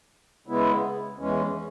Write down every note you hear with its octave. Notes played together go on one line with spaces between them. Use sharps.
C#3 G#3 B3 E4
E2 E3 G#3 C#4